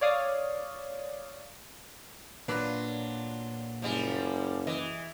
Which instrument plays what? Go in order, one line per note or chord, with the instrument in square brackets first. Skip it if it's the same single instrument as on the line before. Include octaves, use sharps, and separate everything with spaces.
[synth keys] C#5 D5 F5 D#6
[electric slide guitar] A#2 F4 [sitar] F#3 [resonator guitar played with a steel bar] D4 B4
[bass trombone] F#1 [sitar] F3 G3 G#3
[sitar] E3 [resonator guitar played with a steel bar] D#5